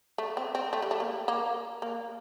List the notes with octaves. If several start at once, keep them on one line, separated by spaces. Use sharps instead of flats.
A3
C4
C4
A3
G3
A3
A#3
A#3
A#3